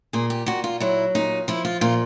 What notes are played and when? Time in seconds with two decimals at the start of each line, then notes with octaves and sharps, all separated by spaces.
0.13 A#2 G#4
0.30 G4
0.46 A#2 F#4
0.64 F4
0.80 F#3 E4
1.15 A#2 D#4
1.48 F3 E4
1.65 F4
1.81 A#2 F4